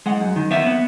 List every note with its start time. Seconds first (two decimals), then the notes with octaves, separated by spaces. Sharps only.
0.06 G#3 F#5
0.20 F#2
0.36 D#3
0.51 B3 E5
0.66 B3